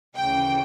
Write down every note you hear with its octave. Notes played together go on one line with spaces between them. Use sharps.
D2 C#3 E3 G5